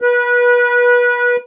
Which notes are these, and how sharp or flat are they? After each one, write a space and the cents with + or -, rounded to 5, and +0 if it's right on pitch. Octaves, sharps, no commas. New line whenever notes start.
B4 -25